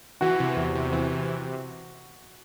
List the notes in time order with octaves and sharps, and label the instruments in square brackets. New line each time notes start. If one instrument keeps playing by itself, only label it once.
[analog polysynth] E3 [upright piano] F#4
[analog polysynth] C3
E2
C3
E3
C3